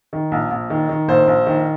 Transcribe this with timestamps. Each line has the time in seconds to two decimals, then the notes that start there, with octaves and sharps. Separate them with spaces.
0.13 D#3
0.32 A#1
0.51 A#1
0.70 D#3
0.89 D#3
1.08 A#1 C5
1.28 A#1
1.46 D#3